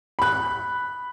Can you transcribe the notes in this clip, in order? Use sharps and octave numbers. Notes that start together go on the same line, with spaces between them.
B5 F#6